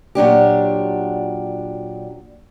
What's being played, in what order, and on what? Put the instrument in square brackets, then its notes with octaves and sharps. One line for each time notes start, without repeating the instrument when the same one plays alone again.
[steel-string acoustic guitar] A#2 F#3 D4 G4